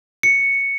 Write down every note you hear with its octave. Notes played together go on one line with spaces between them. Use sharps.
C#7